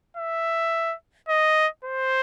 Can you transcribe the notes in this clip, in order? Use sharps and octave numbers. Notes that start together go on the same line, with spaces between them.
E5
D#5
C5